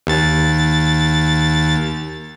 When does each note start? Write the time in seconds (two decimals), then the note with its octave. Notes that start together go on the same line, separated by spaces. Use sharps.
0.07 D#2 A6